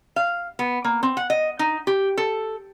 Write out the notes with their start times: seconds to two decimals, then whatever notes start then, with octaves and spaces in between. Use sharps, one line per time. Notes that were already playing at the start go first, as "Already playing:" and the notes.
0.16 F5
0.59 B3
0.84 A#3
1.03 C4
1.17 F#5
1.30 D#5
1.59 D#4
1.87 G4
2.17 A4